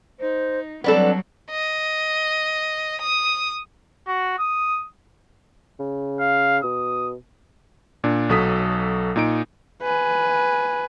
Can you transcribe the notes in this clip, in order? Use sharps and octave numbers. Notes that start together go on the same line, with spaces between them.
D#4 C5
F#3 G3 B3 C4 D4 A4
D#5
D#6
F#4
D#6
C#3
F5
B2 D#6
A#2 D4
B1 F#3 A4 D#6 B6
A#2 D#4 D7
B4 G#5